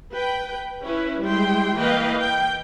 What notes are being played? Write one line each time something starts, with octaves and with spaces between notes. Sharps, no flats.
B4 G5
C#4 E4 B4
G3 G#3 E4 G5 C6
E3 A#3 B4 D#5 F5 G5
G5